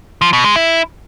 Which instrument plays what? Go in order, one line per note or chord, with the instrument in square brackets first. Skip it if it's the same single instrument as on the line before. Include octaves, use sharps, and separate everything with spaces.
[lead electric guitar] F3
B2
G#3
E4